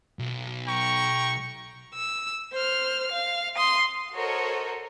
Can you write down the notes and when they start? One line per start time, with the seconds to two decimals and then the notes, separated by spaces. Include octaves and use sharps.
0.19 B1
0.67 G5 A#5 C#6
1.95 E6
2.53 C5 F6
3.12 F5
3.56 C6 D#6
4.14 F#4 A4 A#4 C5 C#5 D#5